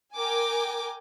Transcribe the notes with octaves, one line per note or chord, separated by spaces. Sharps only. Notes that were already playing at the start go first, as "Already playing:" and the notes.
A#4 G5 G#5 D6